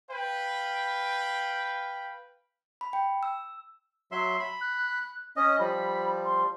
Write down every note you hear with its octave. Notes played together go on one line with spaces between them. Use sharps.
B4 F5 G5
B5
G5
E6
F#3 E5 C6
B5
F#6
C#4 D#5 D#6
F3 G3 B5
C6